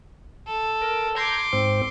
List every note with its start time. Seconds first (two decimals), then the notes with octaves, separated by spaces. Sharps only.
0.47 A4
0.82 A#4
1.16 A#5 C6 D6 G6 G#6
1.53 G#2 C4